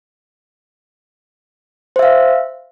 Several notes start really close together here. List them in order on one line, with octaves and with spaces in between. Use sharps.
C5 E5 F5